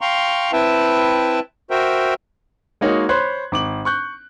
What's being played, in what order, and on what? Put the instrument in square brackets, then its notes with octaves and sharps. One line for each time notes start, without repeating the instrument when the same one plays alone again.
[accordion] F5 G5 A#5 C6 C#6
C4 E4 B4 E5 G5 A5
F#4 A#4 C5 E5 G5
[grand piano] G#3 A#3 D#4 F#4 C#5 F#5
C5 C#5 B5 C6 F#6 G#6
G#1 D6 F#7
C#6 F#6 G6